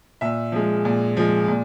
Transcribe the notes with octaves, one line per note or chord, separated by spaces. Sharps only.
A#2 E5
F3 G#3
A#2
F3 G#3
A#2